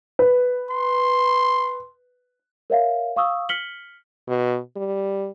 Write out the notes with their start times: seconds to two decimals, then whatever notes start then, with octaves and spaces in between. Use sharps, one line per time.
0.19 B4
0.70 C6
2.70 A#4 C#5 E5 F5
3.16 F5 C#6 D#6 E6
3.49 F6 B6 C#7 F#7 G7
4.28 B2
4.76 G3